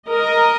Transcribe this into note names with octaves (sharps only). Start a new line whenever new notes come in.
A#4 D#5